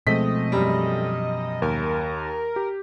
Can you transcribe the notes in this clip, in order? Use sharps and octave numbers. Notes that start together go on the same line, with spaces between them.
B2 F3 G#3 A3 C4 D#5 B6
F#2 G3
D#2 A#4
G4